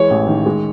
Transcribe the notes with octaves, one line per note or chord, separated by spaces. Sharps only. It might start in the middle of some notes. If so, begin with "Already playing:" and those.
Already playing: E3 G#3 C#5
A1
D#3
G#3